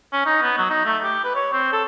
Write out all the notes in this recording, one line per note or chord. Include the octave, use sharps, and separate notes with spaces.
C#4
D#4
B3
F#3
D#4
A3
G4
B4
C#5
C4
A4